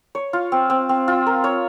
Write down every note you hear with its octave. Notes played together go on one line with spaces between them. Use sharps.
C#5
F4
C4
C4
C4
F4
A#4
C#5